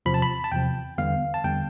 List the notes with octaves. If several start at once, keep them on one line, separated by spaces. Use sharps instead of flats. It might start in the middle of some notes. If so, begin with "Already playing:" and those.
E2 C3 F3 B5
A5
B5
A5
E2 C3 F3 G5
E2 D3 G3 B3 F5
A5
E2 D3 G3 B3 G5